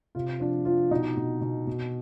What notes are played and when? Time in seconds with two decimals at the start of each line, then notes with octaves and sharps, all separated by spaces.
0.15 C3 F4
0.40 F3 D4
0.65 F3 F4
0.91 B2 D#4
1.17 B2
1.41 B2
1.67 B2